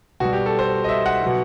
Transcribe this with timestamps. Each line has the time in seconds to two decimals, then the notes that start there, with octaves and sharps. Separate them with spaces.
0.20 B2 G3 F#4
0.33 G4
0.46 A4
0.59 C5
0.84 D#5
0.89 E5
1.06 F#5
1.23 B2 F#3